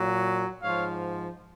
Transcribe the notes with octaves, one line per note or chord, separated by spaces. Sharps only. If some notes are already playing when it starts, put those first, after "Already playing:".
Already playing: A#2 F#3
G#2 F3 C#5 F5